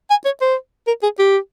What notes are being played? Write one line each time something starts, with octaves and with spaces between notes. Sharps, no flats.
G#5
C#5
C5
A#4
G#4
G4